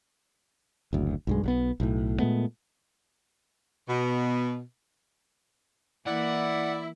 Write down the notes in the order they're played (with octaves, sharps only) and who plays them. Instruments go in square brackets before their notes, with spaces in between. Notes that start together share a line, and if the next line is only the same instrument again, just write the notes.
[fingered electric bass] F#1 D2
B1 G2 G#3
B1 F#3 B3
B1 A2
A#2 G#3 A3 B3
[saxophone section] B2
[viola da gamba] E3 A#3 [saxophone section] E4 [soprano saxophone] D5 [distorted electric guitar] F#5